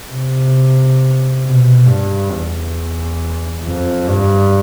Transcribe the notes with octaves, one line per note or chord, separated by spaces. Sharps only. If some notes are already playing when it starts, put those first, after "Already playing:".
C3
B2
G2
E2
F2
G2